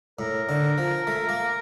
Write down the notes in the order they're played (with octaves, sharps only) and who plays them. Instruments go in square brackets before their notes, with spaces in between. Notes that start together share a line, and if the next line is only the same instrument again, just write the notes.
[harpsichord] A2 [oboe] A#4
[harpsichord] D3
F3
A3
A#3